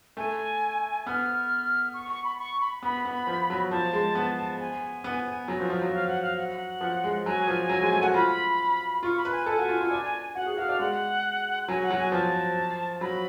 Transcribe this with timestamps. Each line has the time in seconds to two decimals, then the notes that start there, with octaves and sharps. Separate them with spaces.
0.17 A3 G#5
1.06 B3 F6
1.94 C#6
2.09 C#6
2.24 B5
2.39 C#6
2.61 B5
2.83 B3 B5
3.05 B3
3.27 F3
3.50 F#3
3.71 F3 A5
3.93 G#3
4.15 B3
4.60 G#5
5.04 B3
5.48 F#3
5.60 F3
5.70 F3
5.82 F#3
5.93 F5
6.08 F#5
6.22 F5
6.37 F#5
6.81 F3
7.04 G#3
7.26 F#3 G#5
7.48 F3
7.69 F#3
7.81 G#3
7.93 A3
8.03 F#4
8.14 F4 B5
9.03 F4 C#6
9.17 B5
9.25 B4
9.32 G#5
9.46 A4 G#5
9.58 F#4
9.69 F4
9.81 F4
9.91 D4
10.35 F#4 F#5
10.46 G#4
10.57 F#4 F5
10.69 D4
10.79 G#3 F#5
11.68 F#3 G#5
11.83 F#5
11.90 F#3
11.98 G#5
12.12 F3 A5
13.01 F#3 B5